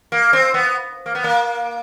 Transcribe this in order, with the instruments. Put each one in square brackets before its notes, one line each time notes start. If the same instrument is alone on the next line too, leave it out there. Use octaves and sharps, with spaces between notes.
[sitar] A#3
C4
B3
A#3
B3
A#3